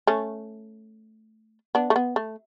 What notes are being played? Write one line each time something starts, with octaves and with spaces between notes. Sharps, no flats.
A3 C#4
B3 D4
A3
B3
A3